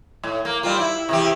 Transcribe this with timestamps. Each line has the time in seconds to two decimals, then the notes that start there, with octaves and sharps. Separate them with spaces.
0.23 A2
0.45 A#3
0.63 G3 C4 F4
0.79 E4
1.09 C3 E3 G4